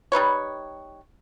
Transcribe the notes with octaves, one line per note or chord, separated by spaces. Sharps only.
G3 D#4 B4 C#5